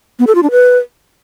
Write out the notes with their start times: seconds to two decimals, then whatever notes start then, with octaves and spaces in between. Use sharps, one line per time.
0.19 B3
0.27 A4
0.35 F4
0.43 D4
0.51 B4